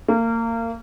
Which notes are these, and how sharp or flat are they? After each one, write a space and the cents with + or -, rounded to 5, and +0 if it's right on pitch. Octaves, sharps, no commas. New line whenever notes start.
A#3 -30